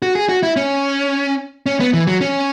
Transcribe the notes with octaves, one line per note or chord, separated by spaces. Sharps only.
F#4
G#4
F#4
E4
C#4
C#4
B3
E3
F#3
C#4